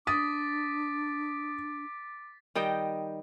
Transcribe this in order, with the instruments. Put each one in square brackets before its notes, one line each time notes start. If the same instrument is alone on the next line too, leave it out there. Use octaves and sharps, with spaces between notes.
[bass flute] D4 [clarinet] D6 [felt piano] D#6 [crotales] A6 B6
[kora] D#3 G3 D#5 G5